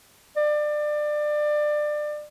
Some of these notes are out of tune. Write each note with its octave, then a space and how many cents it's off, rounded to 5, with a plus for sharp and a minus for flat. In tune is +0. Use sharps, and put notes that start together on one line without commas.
D5 +25